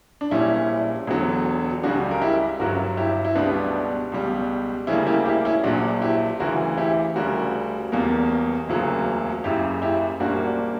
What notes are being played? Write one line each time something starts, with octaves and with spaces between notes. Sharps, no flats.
D4
A#1 A#2 G3 C#4 E4
E1 E2 D3 F#3
C#2 C#3 G3 D4 F#4
A#4
E4 G4
G1 G2 F#3 F#4 A#4
E4 G4
E4
C#2 B2 G3 B3 D4
C#2 B2 G3
D2 C#3 G3 A#3 C#4 E4
E4 G4
E4 G4
C#4 E4
A#1 A#2 F#3 D4 F#4
E4 G4
D2 C#3 E3 F#4 A#4
E4 G4
D2 C#3 G3 F#4 A#4
E1 E2 B2 G3 A#3
E1 D2 C#3 F#3 A#3
F#1 F#2 C#3 E4 G4
E4 G4
A#1 A#2 G3 A#3 D4 F#4